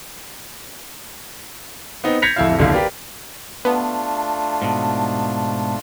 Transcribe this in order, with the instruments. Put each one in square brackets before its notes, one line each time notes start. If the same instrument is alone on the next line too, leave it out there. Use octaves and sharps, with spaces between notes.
[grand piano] B3 C4 D#4
G6 G#6 A#6 B6 C#7 F7
D1 F2 E4 E5 F5
D#1 B1 D3 E4 F5
G4 A#4 B4 D5 F5
[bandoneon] A3 D4 F4 [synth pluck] B3 [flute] A5
[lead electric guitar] G#2 B2